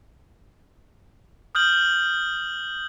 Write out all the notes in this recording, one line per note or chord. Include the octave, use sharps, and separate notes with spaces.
D#6 F6 G6 F#7